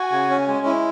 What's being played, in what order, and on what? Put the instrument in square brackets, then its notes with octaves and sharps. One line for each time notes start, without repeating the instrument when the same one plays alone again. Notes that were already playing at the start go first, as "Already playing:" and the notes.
Already playing: [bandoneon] F#4 [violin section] G#5
[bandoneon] C#3
C#4
G#3
E4